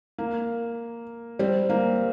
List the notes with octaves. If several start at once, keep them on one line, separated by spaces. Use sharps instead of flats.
A#3
G3 C4
A#3